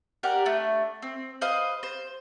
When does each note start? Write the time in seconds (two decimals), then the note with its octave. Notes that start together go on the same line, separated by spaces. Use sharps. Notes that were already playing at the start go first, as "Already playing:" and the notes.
0.23 G4 A#4 D5 F#5
0.46 A3 D4
1.02 C4
1.41 B4 C5 D#5 F5
1.83 C5